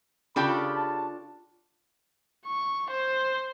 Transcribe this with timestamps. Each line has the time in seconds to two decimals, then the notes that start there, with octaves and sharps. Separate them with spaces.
0.36 C#3 D4 F4 G4 A4 G5 B5
0.75 A5
2.46 C#6
2.91 C5